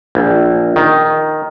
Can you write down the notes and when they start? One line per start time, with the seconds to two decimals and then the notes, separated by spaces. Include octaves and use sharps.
0.15 A#1
0.76 D#3